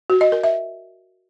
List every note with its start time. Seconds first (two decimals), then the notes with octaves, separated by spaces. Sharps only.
0.10 F#4
0.21 D#5
0.32 A#4
0.44 E5